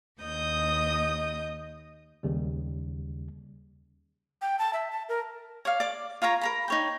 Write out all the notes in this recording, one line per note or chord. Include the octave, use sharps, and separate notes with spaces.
D#2 D#5 D#6 G6
D#2 C#3 G3
G5
A5
E5
A5
A#4
C#5 D5 F5
D5 D6
F4 A#4 C#5 A#5
A#4 A#5 B5
D#4 C#5 G5